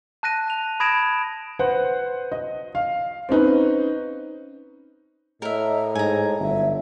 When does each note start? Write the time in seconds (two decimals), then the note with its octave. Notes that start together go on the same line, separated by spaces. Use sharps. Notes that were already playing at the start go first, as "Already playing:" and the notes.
0.23 A5 F#6 A#6 D#7
0.48 A5 F7
0.80 B5 D#6 G#6 A#6 D7 E7
1.59 B4 C5 F#5
2.32 D#5
2.75 F5
3.29 C4 C#4 D#4 B4
5.42 A2 A#4 D#5 E5
5.95 G#2 G#5 A#5
6.39 G1 F#3 E5